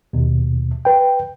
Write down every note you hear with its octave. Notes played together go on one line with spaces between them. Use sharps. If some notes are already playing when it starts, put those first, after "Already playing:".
D#2 B2
B4 G5